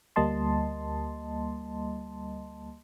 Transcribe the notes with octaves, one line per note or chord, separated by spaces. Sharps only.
D2 G3 A#3 D#5 A5 C6